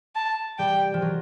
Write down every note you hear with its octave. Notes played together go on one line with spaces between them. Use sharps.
A5
G3 G5
F3
F#3